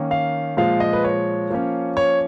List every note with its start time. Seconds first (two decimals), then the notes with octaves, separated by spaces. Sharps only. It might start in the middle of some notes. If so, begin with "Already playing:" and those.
Already playing: D#3 A#3 C#4
0.11 F5
0.57 A#2 F3 G#3 F5
0.80 D#5
0.93 B4
1.05 C#5
1.50 F3 A#3 C#4
1.97 C#5